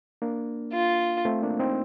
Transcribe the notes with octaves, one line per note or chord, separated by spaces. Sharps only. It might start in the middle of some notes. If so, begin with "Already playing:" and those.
A#3 D4
F4
A3 C4
A#3 D4
C4 D#4